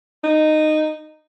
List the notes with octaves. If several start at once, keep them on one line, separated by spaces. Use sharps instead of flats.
D#4